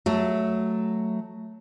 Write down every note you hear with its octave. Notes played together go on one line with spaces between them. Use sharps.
F#3 A3